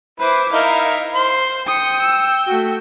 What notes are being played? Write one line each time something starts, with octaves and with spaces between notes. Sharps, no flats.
E4 B4 C5 D6
D#4 E4 A#4 F5
C5 C6
G5 D#6 C#7
E6
A3 F#4